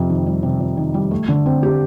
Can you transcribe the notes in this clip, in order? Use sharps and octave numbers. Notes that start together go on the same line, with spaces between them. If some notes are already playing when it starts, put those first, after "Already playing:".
Already playing: F2 C3
D#3
G3
C3
F2
D#3
G3
A3
D3
C4
G4